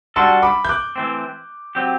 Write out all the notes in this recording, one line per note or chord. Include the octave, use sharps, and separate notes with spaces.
G3 D4 F#4 A4 A5 C6
B5 D6
G6
D6 F#6
E3 A3 C4
F#3 C4 G4